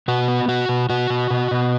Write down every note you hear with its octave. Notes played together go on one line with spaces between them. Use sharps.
B2 F#4
B3
B2 F#4
B2
B2 F#4
B2
B2
B2